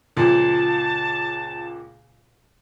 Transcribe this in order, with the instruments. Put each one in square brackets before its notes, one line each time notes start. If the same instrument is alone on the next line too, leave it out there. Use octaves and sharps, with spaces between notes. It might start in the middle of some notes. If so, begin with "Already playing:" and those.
[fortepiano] C#2 A#2 F3 [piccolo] A5